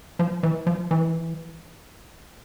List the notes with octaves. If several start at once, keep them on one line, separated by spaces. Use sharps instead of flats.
F3
E3
F3
E3